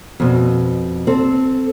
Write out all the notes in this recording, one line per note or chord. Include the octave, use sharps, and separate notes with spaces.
F2 B2
C4 A4